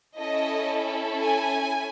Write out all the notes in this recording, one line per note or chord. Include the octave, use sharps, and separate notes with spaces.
C#4 E4 A4 D#5
G#5